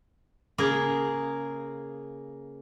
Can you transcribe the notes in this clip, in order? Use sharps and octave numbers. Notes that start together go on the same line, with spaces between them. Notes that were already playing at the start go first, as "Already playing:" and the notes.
C#3 A#3 G#4 A#4